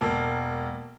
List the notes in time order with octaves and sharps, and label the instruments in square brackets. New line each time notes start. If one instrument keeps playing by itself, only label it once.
[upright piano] E1 A#3 A4